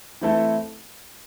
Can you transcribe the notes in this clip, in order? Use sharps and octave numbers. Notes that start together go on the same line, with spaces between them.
E3 A3 C4 E4 A4